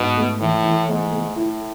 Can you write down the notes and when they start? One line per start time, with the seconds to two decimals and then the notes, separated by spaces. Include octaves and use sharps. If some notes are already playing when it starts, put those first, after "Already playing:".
Already playing: G#2 B2
0.17 A3
0.40 A2 E3
0.64 E3
0.88 G#2 A3
1.12 A3
1.36 A2 E4